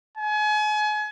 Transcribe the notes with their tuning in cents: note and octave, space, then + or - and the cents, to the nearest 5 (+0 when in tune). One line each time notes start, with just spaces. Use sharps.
G#5 +35